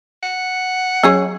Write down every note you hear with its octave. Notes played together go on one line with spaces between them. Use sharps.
F#5
F#3 C#4 G#4 C#5